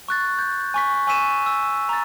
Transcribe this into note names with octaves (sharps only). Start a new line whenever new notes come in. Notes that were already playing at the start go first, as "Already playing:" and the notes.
C#6 F#6 A6
G6
G#5 C#6 B6
G#5 C#6 E6 B6 D#7 E7
E6
A#5 A6